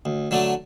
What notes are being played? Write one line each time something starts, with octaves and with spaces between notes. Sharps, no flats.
D2
D3 F#3 A3 D4